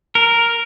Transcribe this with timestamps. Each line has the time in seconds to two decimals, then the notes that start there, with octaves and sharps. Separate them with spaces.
0.15 A#4